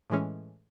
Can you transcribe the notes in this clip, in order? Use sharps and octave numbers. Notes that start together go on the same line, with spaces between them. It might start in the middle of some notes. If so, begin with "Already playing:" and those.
A2 E3 G#3 C#4